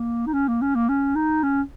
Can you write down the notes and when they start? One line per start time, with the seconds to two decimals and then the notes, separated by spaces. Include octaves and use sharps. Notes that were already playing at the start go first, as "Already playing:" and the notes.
Already playing: A#3
0.27 D#4
0.33 C#4
0.48 A#3
0.62 C#4
0.75 A#3
0.89 C#4
1.15 D#4
1.43 C#4